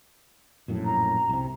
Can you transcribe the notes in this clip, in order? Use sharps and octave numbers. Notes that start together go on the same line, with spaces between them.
A#1 F#2 A2
A#5
C2 C3